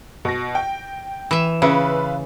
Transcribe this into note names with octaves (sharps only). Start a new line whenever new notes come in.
B2 A#6
G5
E3 E5
C#3 F4 B4 E5